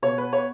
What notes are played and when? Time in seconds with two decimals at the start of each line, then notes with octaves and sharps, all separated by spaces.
0.03 B2 C#5
0.18 B3 B4
0.33 C#5